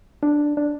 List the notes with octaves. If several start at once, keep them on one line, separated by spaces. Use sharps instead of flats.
D4
D4